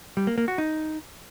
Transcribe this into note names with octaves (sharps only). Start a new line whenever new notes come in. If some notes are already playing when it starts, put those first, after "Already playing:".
G3
A#3
A#3
F#4
D#4